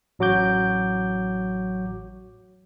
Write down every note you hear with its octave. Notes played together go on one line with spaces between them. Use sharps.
A1 F#3 F#4 D6 G6